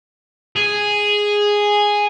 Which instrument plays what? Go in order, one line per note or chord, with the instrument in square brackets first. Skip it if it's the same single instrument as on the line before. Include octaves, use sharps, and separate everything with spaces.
[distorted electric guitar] G#4